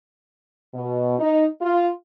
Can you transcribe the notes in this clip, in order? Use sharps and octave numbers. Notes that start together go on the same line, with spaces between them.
B2
D#4
F4